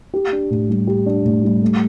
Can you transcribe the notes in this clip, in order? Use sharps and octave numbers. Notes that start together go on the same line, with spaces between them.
G4
D4
A2
G3
G4
D4
A2
G3
A3